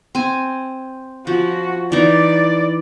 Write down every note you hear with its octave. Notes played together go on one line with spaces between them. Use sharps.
C4 G#5
F3 F#4
E3 D#4 D5